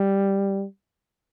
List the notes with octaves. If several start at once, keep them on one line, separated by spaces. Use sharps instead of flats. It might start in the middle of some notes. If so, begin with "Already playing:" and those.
Already playing: G3